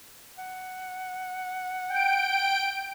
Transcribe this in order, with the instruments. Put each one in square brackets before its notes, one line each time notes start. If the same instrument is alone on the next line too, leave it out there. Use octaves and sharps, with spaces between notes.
[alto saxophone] F#5
[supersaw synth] G5 D7